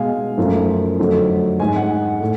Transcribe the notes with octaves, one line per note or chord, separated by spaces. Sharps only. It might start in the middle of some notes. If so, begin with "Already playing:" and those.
Already playing: B2 G#3 F5 G#5
F#2 F3 A3
F2 D3 F#3 A3
G#2 G#3 G#5
F#5
A2